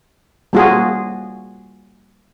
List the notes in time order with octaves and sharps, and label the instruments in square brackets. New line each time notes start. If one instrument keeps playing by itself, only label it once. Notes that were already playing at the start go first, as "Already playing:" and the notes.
[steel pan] G3 A#3 F4 F#4 G#4